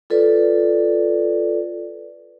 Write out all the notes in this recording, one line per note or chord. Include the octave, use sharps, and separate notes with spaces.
F4 A4 B4 D5